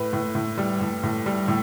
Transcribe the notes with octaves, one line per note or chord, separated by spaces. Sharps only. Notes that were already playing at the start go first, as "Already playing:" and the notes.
Already playing: A2 B4
A2
A2
G3
A2
A2
G3
A2